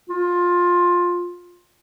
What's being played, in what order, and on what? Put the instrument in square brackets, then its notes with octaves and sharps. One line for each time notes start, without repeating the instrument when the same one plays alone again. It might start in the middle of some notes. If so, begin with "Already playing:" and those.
[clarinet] F4